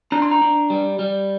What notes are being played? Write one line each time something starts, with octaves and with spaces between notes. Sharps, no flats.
D4 A#5
C6
A#5
D4
G3
G3